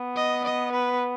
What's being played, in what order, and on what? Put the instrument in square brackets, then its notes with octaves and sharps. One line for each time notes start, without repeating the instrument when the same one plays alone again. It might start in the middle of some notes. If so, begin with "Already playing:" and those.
Already playing: [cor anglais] B3
[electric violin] D#5
D#5
B4